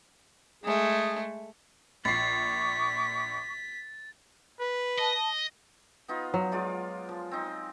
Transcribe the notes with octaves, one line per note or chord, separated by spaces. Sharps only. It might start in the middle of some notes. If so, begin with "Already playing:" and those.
G#3 A3 G#4
A#1 C#6 D6 A6 B6 C7
B4
D#5 A5
B3 D#4 F4
F#3
G#3 F4 D5
F3
C4 D#4